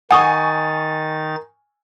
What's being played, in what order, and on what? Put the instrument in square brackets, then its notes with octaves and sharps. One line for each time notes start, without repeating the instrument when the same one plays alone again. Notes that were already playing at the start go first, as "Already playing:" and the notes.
[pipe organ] D#3 D#4 A6 [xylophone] F#5 D#6 [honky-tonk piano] G#5 C#6